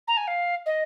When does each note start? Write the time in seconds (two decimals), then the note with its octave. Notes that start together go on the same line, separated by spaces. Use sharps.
0.07 A#5
0.17 G#5
0.27 F5
0.65 D#5